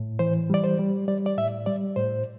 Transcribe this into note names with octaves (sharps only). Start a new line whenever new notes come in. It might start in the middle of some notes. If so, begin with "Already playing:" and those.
Already playing: A2
E3 C5
G3 D5
C5
G3
G3 D5
D5
A2 E5
G3 D5
A2 C5